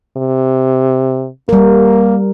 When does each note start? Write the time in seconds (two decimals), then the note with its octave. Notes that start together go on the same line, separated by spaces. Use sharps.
0.17 C3
1.49 G3 A#3 A#4